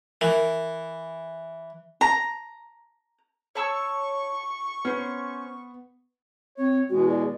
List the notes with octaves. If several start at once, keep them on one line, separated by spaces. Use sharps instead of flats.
E3 A#4
A#5
C#5 A5 C#6 E6
B3 C#4 C5
C4 C#5
E2 B2 G#3 F#4
D5